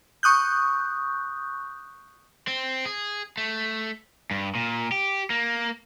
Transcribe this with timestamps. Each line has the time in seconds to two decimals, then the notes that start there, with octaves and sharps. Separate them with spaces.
0.23 C#6 D#6 F#6 G6
2.48 C4
2.85 G#4
3.37 A3
4.31 G2
4.55 A#2
4.92 G4
5.30 A#3